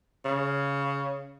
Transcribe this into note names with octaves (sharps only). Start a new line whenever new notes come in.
C#3